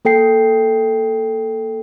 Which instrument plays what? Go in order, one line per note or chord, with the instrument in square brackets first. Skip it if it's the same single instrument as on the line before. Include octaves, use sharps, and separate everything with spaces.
[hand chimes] A#3 A4 G5 C7